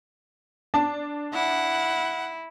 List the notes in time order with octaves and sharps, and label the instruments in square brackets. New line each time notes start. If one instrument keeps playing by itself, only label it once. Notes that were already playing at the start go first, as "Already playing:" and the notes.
[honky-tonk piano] D4 [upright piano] A5
[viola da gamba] E4 [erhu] F#5